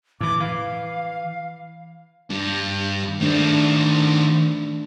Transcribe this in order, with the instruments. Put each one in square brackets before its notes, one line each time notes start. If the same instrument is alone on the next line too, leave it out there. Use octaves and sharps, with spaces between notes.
[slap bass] A2 E3 [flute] D6
[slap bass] E3 [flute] F5
[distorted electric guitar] G2
[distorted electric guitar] D#3 C4 [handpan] A3 D4